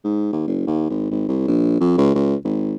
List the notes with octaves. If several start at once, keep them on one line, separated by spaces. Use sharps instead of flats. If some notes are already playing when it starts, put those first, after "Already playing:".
G#2
D#2
F#1
D#2
G#1
G#1
C2
A#1
F2
C#2
C#2
G#1